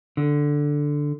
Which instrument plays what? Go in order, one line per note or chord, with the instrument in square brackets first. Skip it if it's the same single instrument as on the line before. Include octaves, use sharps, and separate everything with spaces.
[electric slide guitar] D3